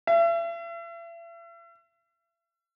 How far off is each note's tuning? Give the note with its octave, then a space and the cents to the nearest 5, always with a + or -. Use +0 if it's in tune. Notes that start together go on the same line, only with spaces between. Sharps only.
E5 +40